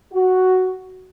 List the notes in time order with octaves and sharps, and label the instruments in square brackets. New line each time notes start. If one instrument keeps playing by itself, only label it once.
[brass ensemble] F#4